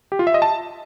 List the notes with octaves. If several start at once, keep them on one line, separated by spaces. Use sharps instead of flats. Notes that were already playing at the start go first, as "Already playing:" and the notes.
G4
F4
E5
D#5
A5